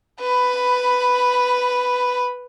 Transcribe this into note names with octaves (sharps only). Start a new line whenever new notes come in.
B4 B5